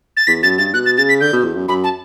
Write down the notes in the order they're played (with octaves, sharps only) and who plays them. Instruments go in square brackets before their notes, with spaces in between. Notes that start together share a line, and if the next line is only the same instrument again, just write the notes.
[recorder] A6
[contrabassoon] E2 [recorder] B6
[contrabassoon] F#2 [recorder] A6
[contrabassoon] G2 [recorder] A6
[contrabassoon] B2 [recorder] F#6
[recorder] A6
[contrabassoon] C#3 [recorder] A6
[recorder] B6
[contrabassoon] D3 [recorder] G6
[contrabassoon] B2
E2
F#2
[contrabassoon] F#2 [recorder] B5
[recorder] A5